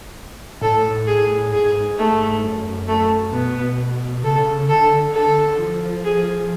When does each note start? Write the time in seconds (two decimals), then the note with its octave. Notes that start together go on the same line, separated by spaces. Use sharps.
0.61 A2 A4
1.07 G#4
1.52 G#2 G#4
1.98 A3
2.43 F#2
2.88 A3
3.32 B2 B3
4.23 C#3 A4
4.59 C#3
4.69 D3 A4
5.13 A4
5.59 F3
6.05 G#4